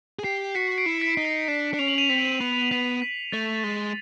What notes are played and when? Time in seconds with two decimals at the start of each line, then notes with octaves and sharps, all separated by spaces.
0.19 G#4
0.24 G4 C7
0.55 F#4 B6 C#7
0.78 C7 D7
0.86 E4
1.01 B6 C#7
1.17 D#4
1.25 C7
1.48 D4 C7
1.74 D4
1.79 C#4 F7
1.88 F#7
1.98 D#7 F7
2.10 C4 B6
2.41 B3
2.71 B3 B6
3.02 B6
3.32 A3 A6
3.64 G#3 A6